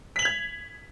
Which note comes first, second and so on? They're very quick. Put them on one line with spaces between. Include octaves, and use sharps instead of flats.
B6 F#7 F7 G#6